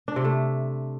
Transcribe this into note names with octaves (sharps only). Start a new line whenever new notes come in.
D4
C3
A3